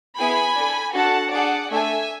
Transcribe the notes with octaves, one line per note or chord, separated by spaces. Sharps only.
B3 E4 G#4 G#5 B5
D4 A4
D4 F#4 A4 F#5 A5
D4 G#4 D5 F#5
A3 D4 A4 E5 G#5